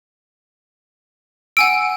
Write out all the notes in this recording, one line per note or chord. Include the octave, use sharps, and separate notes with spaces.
F#5 G#5 E6 D7